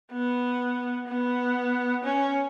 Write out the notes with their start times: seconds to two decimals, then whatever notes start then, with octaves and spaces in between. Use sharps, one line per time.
0.12 B3
1.08 B3
2.04 C#4